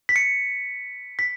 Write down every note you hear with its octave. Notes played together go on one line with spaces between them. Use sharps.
B6
C#7
B6